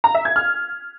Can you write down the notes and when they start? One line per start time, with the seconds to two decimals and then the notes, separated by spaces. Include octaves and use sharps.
0.04 A#5
0.15 E5
0.25 G#6
0.36 F6